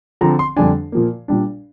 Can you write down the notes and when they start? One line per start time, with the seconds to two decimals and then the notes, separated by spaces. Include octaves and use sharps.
0.21 D3 F3 C4 A#5
0.39 C6
0.56 F2 D3 G3 D4 G#5
0.92 A#2 F3 A#3
1.28 A#2 G3 D4